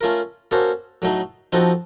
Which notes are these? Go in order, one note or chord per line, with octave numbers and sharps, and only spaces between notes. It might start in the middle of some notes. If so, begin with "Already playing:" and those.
A3 C#4 F4 A#4
A#3 C#4 F#4 A4 C5
A2 F#3 A3 D#4
F3 C4 D#4 F#4 A4